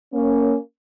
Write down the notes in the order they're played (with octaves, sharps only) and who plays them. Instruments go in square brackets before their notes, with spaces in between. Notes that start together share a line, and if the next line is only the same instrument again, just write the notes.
[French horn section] A#3 C#4